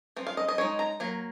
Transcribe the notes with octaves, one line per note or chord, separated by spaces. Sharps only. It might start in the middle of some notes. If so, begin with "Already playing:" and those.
F3 C4
F5
D#5
D#5
G#3 D#4 C#5
A#5
F#3 A#3